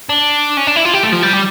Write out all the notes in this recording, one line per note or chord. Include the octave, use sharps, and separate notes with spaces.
D4
C#4
D4
E4
F4
G4
A3
F3
G3
G4